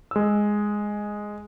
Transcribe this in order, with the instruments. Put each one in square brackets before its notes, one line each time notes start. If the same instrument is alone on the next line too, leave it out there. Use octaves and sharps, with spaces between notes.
[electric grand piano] G#3 E6